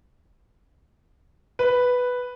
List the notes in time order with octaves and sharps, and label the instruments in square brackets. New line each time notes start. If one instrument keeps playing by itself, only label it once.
[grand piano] B4